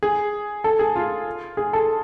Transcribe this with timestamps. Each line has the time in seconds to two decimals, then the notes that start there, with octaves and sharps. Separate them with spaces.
0.03 G#4
0.64 A4
0.79 G#4
0.96 F4
1.57 G#4
1.73 A4